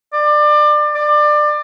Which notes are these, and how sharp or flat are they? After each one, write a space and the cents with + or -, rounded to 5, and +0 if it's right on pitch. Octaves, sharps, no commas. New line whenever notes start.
D5 +25
D5 +25